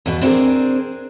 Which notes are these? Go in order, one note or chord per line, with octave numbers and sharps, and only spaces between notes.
E2 B2
C4 D4 E4 F#4 G#4 A#4